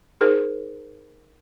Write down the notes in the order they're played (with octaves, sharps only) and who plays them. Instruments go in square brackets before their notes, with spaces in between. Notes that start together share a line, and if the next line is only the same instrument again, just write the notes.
[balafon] D#4 G#4 A#4 C5